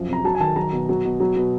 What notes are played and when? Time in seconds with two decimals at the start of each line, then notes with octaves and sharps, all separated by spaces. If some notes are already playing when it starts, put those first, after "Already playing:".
Already playing: F#2 F3
0.08 C3 A#5
0.25 F#3 A5
0.35 G#5
0.40 D#3 A5
0.56 F#3 A#5
0.73 B2
0.89 F#3
1.05 B2
1.20 F#3
1.36 B2